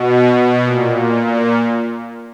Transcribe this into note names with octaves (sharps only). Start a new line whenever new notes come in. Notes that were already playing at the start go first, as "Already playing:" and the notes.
Already playing: B2
B2
A#2
A#2
A#2